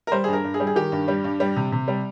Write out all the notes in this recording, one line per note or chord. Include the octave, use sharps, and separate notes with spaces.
A#4
G3 C5
G2 G#4
A#4
G2
G#4
G3
G#4
D#3 G4
G2
G3
G2
G3
C3
C3
G3